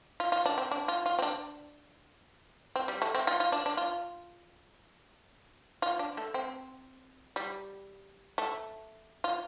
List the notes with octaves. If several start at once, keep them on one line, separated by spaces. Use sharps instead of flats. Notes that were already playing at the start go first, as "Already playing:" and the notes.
F4
F4
D4
C4
D4
F4
F4
C4
D4
C4
G3
A3
C4
F4
F4
D4
D4
F4
F4
D4
A3
C4
G3
A3
F4